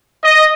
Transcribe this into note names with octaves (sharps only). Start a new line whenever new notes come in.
D#5